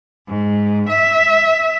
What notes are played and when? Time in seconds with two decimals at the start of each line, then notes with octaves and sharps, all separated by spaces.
0.27 G#2
0.87 E5